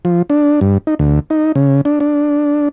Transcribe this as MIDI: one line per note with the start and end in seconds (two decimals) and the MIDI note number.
0.05 0.22 53
0.30 0.60 62
0.61 0.78 43
0.87 0.95 63
0.99 1.20 38
1.30 1.52 63
1.55 1.81 49
1.85 2.00 62
2.00 2.69 62